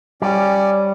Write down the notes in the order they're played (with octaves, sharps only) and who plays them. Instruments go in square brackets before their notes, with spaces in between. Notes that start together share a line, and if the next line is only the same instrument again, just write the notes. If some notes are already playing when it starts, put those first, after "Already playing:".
[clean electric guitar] G3 [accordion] C#4 D5